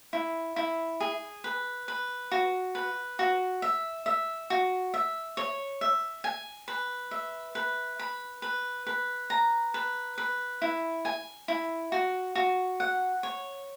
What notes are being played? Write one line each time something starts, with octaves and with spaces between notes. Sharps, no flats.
E4
E4
G#4
B4
B4
F#4
B4
F#4
E5
E5
F#4
E5
C#5
E5
G#5
B4
E5
B4
B5
B4
B4
A#5
B4
B4
E4
G#5
E4
F#4
F#4
F#5
C#5